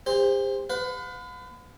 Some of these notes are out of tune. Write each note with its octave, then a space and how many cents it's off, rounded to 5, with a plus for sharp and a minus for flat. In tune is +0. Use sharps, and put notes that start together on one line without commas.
G4 +45 C5 +0
B4 +35 F5 +45